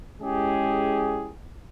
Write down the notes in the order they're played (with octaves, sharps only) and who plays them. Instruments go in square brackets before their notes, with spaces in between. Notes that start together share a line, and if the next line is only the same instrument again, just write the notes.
[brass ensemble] G#3 C#4 E4 G4 G#4